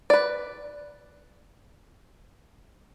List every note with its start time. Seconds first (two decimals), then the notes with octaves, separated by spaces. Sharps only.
0.10 B4 D5